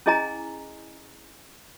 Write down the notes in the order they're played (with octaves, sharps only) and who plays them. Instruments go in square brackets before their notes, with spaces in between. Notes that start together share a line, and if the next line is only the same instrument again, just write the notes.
[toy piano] C#4 E4 G#4 D#5 G#5 A#5